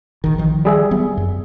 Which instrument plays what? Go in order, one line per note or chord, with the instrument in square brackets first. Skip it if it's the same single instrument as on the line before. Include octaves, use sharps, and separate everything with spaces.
[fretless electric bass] A#1 D#3
D#3 F3
[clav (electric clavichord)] G3 G#4 E5
[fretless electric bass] F#3 B3
F#2